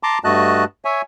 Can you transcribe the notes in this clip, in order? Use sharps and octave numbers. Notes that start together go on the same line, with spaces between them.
A5 A#5 C6 D6
G2 A3 F#4 D#5 A5 F#6
C#5 E5 G#5